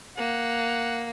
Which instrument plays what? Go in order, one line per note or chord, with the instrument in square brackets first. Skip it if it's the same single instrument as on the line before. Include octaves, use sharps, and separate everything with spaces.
[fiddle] A#3 [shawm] F#5